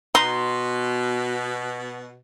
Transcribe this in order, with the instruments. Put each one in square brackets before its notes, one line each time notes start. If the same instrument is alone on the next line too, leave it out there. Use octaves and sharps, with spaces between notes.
[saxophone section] B2 [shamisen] D#4 [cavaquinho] C6